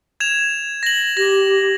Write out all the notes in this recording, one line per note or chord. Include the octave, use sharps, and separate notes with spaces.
G#6 E7 F7
A#6 F#7
G4 A#6